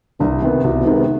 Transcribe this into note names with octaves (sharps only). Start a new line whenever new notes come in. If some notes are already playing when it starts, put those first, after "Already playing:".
C2 G2
C3 D#3 B3
C2 B2
B2
G#2 C3 D#3 B3